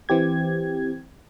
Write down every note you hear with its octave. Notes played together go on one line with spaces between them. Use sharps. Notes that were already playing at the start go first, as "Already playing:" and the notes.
E3 C4 G4 G#6